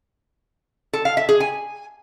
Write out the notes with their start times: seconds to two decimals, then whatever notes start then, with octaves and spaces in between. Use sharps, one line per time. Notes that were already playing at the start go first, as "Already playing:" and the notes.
0.93 A4
1.05 F5
1.17 E5
1.29 G#4
1.40 G#5